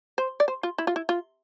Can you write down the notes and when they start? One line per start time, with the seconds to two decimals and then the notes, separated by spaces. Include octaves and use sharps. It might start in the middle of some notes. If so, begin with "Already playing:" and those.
0.18 C5
0.40 D5
0.48 C5
0.63 F4
0.78 E4
0.87 F4
0.96 E4
1.09 F4